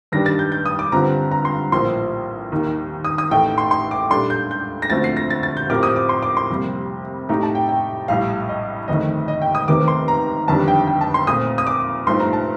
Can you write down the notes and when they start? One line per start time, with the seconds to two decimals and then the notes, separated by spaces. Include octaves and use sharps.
0.12 G2 D#3 G3 D4 G4 A#6
0.26 A6
0.39 G6
0.52 G6
0.66 D#6
0.79 D6
0.92 G2 D3 G3 C4 F4 A#5
1.31 A#5
1.45 C6
1.72 A#1 A2 F3 A#3 C6
2.52 D#2 D#3 A#3
3.05 D#6
3.18 D#6
3.31 A1 A2 A3 D#4 A4 G5
3.58 C6
3.71 C6
3.91 D6
4.10 A#2 G3 D4 A4 C6
4.30 G6
4.51 G6
4.82 A#6
4.90 D2 D3 F3 A3 C4 A6
5.04 C7
5.17 A#6
5.30 A6
5.43 A6
5.57 G6
5.69 A2 F3 C4 G4 A#4 D6
5.83 D#6
5.96 D6
6.09 C6
6.23 D6
6.37 C6
6.50 F2 C3 G3 A#3
7.29 A2 A3 D#4 G4 A#5
7.43 A5
7.55 G5
7.69 G5
8.08 A#1 A2 G3 F5
8.49 D#5
8.88 G1 F2 D#3 A3 D#5
9.28 D#5
9.42 G5
9.55 D#6
9.68 F1 D#2 D#3 A3 C4 D6
9.88 C6
10.08 A#5
10.47 G1 F2 D#3 G3 D4 A5
10.68 G5
10.87 G5
11.01 A5
11.14 C6
11.27 A#2 A3 C4 D#6
11.58 D#6
11.67 D6
12.07 G2 F3 A3 D#4 C6
12.20 A#5
12.33 A5